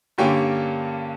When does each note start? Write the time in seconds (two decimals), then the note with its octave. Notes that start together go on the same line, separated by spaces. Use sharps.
0.18 G2 D3 A#3 C#4 G4 G5